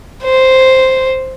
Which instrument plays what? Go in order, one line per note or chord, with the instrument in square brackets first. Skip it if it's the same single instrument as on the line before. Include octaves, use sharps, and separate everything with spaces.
[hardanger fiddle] C5